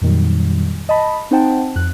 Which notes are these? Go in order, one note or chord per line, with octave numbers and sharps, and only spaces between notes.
F2 A#2 D#3 F#3 G3
D#5 A5 B5
C4 D#4 C5 F#5 G5 A5
F2 F#6